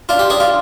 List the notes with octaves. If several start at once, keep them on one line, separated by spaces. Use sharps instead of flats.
D4 F4
G4
D4 G#4
F4